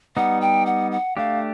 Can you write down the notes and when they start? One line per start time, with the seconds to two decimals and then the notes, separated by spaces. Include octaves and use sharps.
0.16 G3 B3 D#4 F#5
0.41 G5
0.66 F#5
0.92 F#5
1.17 A3 D4 G4 F5